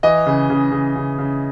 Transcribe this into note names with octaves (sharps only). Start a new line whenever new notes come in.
E3 D#5
C#3
C#3
C#3
C#3
C#3